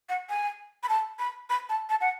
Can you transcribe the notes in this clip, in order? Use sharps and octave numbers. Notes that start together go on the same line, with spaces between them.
F#5
G#5
B5
A5
B5
B5
A5
A5
F#5